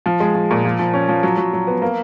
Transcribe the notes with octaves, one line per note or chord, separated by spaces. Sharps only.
F3
G#3
F3
A#2
F3
F3
C#4
F3
F#3
F#3
F#3
B3
A#3